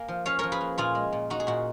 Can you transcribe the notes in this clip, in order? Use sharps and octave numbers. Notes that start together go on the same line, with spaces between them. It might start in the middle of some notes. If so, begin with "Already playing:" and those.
Already playing: A#3 G#5
F3
C#4 C#5 F5
F3 A#4 C#5
G#4 B4
A#3
A#2 F4 G#4
G#3
A#2
D#4 F#4
G#4
A#2 F#4